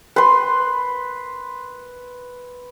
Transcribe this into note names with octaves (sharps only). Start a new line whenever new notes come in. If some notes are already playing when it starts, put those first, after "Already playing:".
B4 C6